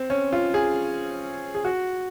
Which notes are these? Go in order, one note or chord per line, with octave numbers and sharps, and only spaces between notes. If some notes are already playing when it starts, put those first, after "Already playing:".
Already playing: C4
C#4
F4
G#4
G#4
F#4